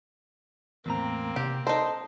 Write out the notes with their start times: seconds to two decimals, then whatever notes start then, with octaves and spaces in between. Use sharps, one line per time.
0.86 E2 A2 A#3 C4 A#5
1.36 C3 G4
1.67 D#4 A4 C5 D#5 A5